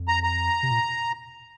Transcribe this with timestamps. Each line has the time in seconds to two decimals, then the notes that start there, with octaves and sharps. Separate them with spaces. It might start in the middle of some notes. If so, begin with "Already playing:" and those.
Already playing: F2
0.08 A#5
0.24 A#5
0.63 C3
0.71 A#2